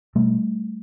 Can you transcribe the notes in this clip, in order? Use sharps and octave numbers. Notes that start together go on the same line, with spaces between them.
B2 G3 A3